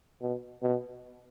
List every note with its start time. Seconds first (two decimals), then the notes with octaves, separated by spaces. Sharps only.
0.21 B2
0.62 B2